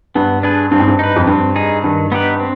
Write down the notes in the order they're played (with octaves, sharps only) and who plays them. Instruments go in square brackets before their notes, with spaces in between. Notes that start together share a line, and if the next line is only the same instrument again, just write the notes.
[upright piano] G2 [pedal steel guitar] B3
[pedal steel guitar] D4 G#4 B4
[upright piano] G2 [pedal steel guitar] C4
[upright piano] G#2
G2
[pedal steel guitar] D#4 B4
[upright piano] F2
[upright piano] G2 [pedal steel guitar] C4
[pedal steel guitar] D#4 G#4
[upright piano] G2 [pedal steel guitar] D#3
[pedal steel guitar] B3 D#4 G4 B4
C4